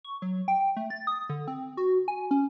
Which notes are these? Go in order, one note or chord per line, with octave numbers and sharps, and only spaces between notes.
C#6
F#3
G5
A3
A6
D#6
D3
C4
F#4
G#5
C#4